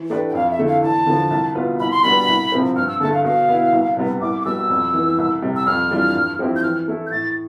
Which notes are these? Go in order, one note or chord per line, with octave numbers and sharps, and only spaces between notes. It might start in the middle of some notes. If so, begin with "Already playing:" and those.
Already playing: E3
A3 D4 G4 B4
G5
F2 F5
E5
D3 A3 E4
F5
E2 A5
D3 F3
C2
B2 B3 F4 B4
C2 B5
C6
B2 G3 B3 D4 B5
C2
C3 F3 C4
G2 F6
E6
D3 A3 A5
F5
B2 F5
B3 E4
C2
C3 G3 B3
C2 D6
D6
B2 G3 E6
F2
E3
B3
C2
C3 G3
E6
F2 F6
E3 G3 D4 F4
G2
F3 C4 E4 G4
G6
E3 F6
A3 E4 A4
G6
A2 A6